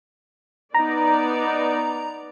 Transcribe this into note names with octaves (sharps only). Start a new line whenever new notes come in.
B3 D#4 D5 A#5